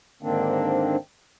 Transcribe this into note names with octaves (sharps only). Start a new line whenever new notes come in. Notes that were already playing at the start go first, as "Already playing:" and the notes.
G#2 D3 D#3 A#3 C4 D4